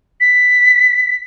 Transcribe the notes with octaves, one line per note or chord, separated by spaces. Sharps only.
B6